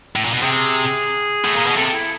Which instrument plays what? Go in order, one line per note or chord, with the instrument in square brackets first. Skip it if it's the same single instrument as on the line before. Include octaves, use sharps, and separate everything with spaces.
[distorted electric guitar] A2
A#2
B2
[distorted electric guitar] C3 [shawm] G#4
[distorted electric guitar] A2
A#2
B2
[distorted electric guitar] C3 [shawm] A4
[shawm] E4